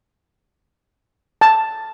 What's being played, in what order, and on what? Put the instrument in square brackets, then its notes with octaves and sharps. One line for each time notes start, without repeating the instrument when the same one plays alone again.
[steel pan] A5